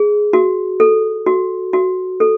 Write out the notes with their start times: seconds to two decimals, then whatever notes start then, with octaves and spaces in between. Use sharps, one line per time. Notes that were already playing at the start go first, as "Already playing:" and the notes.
Already playing: G#4
0.33 F#4
0.80 A4
1.26 F#4
1.73 F#4
2.20 A4